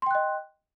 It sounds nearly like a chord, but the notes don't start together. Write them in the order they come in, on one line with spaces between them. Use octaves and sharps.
C6 G5 F#6 D#5